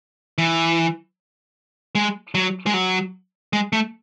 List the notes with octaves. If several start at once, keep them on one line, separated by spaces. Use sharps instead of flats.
E3
G#3
F#3
G#3
F#3
G#3
A3